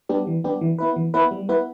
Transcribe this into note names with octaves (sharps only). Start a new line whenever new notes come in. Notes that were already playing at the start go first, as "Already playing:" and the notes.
G3 B3 D4 G4
E3
G3 B3 D4 G4
E3
B3 E4 B4
E3
B3 E4 B4
G3
B3 E4 B4